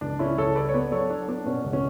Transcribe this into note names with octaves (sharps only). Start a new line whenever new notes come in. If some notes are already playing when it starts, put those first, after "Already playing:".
C#2 D4
C#3 C#4 E4
C#2 A4 C#5
G3 B4 D5
C#5
B3 B4 D5
F#3 A4 C#5
F#3 D4
B3 D4
B2 C#4
C#2
C#4